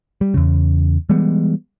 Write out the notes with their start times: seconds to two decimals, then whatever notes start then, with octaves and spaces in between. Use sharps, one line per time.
0.21 G3
0.34 E2 C#3
1.09 E3 G3 G#3 B3